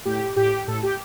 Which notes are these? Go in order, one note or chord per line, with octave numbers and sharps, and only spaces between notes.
A2 G4
A2 G4
A2 A4
G4